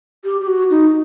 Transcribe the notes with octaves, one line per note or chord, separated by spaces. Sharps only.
G4
G4
F#4
D#4